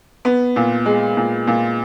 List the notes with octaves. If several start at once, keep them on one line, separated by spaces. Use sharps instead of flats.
B3
A#2
G#3
A#2
A#2